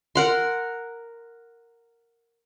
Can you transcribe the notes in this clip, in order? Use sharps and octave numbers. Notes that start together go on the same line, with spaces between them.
A#4 F#5 C6